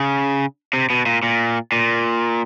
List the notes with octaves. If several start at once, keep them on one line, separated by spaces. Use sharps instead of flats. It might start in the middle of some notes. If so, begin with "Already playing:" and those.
Already playing: C#3
C3
B2
A#2
A#2
A#2